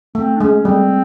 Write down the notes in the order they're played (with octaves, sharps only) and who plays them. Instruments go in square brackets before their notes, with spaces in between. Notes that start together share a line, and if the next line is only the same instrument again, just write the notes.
[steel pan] A3 [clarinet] C4
[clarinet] D4
[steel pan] G#3 [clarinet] C#4
[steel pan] G3 [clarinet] C4